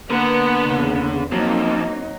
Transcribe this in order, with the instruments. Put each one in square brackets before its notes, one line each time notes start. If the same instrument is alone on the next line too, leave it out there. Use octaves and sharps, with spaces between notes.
[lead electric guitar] D3 [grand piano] A#3 [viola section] B3
[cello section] E2 C#3
[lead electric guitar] F2 [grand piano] F#3 [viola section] A#3 [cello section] C4 D#4